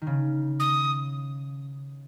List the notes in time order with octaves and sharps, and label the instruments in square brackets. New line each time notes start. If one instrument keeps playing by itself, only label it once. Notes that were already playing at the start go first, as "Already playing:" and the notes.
[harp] D#3
C#3
[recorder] D#6